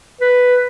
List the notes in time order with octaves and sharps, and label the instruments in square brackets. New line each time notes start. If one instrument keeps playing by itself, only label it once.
[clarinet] B4